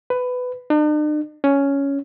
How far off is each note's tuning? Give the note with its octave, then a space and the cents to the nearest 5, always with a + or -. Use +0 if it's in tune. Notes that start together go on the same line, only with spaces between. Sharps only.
B4 +15
D4 +45
C#4 +5